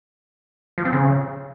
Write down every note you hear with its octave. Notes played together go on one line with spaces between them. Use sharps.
F3
C4
C#3